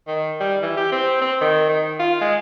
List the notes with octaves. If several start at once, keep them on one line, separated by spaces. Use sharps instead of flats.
D#3
G3
E3
G4
C4
C4
D#3
D#3
F4
G#3